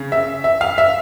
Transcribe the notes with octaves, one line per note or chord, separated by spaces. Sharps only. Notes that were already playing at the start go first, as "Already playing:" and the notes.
Already playing: C#3
E5
E5
F5
E5